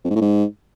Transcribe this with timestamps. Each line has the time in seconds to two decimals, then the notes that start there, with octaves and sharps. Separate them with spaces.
0.05 F2
0.10 G#2
0.16 A2
0.21 G#2